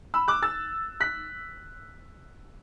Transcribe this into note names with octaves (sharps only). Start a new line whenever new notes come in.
B5 E6
D6 F#6
E6 A6
F#6 B6